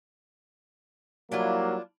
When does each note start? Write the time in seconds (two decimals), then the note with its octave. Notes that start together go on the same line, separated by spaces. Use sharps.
1.32 F#3 G3 A#3 D4 E4 F4